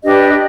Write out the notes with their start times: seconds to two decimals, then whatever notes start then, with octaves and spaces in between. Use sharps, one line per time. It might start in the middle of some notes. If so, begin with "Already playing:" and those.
0.04 D4 G4 B4 D#5
0.29 D#5